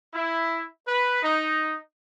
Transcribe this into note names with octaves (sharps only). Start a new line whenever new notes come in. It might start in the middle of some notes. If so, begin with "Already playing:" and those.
E4
B4
D#4